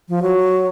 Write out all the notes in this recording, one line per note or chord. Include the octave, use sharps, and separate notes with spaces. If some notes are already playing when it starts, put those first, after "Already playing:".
F3
F#3